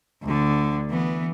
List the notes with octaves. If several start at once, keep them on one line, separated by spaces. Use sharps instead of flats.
D2 D3
E3 B3